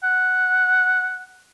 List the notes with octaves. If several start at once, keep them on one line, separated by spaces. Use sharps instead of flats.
F#5